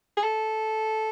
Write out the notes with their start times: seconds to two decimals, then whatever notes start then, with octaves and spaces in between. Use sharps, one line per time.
0.17 G#4
0.23 A4